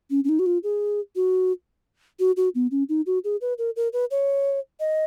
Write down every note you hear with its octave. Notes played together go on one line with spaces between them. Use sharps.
C#4
C#4
D#4
F#4
F4
G#4
F#4
F#4
F#4
B3
C#4
D#4
F#4
G#4
B4
A#4
A#4
B4
C#5
D#5